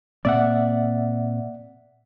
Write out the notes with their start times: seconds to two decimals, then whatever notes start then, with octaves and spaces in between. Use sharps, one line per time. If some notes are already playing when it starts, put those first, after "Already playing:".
0.25 A#2 A#3 C4 D5 E5 F#5